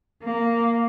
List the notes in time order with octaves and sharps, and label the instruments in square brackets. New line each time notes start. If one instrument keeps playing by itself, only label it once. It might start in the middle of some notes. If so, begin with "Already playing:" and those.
[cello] A#3